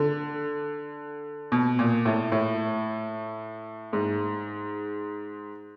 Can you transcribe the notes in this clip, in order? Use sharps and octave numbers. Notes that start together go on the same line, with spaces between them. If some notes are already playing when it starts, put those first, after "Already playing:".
Already playing: D3
B2
A#2
A2
A2
G#2